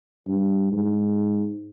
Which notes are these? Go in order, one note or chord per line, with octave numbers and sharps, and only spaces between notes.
G2
G#2